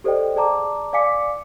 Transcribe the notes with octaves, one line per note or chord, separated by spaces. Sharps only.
G4 A4 C5 D5 D#5 G5
G#4 D5 A5 A#5 D6
D5 F5 G#5 D6 B6 C#7